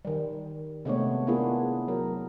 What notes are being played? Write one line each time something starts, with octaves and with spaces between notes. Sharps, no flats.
D#3 G3
C3 G#3 A3 B3 D4 C#5
A#3 B3 D4 E4 F4 G#4
F#3 A#4